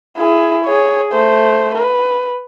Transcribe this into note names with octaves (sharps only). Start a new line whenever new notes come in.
E4 G#4
G#4 C#5
A3 C5
B4